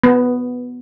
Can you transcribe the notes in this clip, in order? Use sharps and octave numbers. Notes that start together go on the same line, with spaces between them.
B3